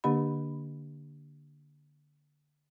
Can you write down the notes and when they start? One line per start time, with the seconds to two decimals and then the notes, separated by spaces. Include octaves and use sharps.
0.04 D3 A#3 D4 G4 D#5 B5